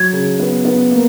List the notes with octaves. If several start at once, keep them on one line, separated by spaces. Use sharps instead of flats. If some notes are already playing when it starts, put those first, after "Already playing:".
Already playing: F#3 G#6
C#3
B3
B3
A#3